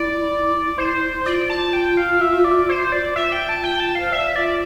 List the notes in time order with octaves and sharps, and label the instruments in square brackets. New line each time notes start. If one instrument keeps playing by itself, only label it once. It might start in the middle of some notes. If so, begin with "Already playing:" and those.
Already playing: [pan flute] E4 [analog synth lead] D5
[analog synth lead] C5
[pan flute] F4 [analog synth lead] D5
[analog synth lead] A5
G5
F5
E5
D5
C5
D5
[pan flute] F4 [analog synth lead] E5
[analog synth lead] G5
A5
G5
A5
[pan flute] C5 [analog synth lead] F5
[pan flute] D5 [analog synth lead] E5
[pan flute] F4 [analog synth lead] D5